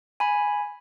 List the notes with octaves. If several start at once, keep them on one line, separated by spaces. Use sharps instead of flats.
G#5 B5